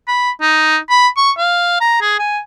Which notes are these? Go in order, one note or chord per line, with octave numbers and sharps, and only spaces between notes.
B5
D#4
B5
C#6
F5
A#5
G#4
G#5